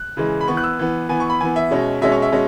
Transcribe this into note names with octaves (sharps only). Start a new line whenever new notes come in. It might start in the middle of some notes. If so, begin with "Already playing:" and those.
Already playing: F#6
C#3 E3 G#3
B5
E3 B3 C#6
F#6
E6
E3 B3
E3 B3 G#5
C#6
B5
E3 B3 G#5
E5
B2 G#3 C#4
B2 G#3 C#4 E5
C#5
E5
B2 G#3 C#4